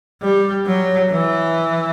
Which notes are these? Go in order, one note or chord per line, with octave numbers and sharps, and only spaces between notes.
G3
F#3
E3